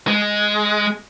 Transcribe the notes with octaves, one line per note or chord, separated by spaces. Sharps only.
G#3